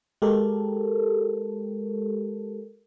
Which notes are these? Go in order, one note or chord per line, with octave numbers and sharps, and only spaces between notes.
G#3 G4 A4 A#4